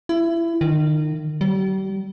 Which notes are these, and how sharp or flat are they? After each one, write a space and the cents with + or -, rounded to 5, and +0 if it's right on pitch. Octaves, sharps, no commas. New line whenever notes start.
E4 +25
D#3 -30
G3 -40